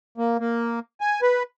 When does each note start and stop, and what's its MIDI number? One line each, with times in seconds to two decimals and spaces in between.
0.18 0.37 58
0.40 0.79 58
1.01 1.21 80
1.22 1.43 71